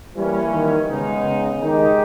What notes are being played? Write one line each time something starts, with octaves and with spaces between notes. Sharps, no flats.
E3 G3 A#3 C#4
D#3
C#3 G#3 B3 D#4
C#3
D#3 G#3 D#4 G4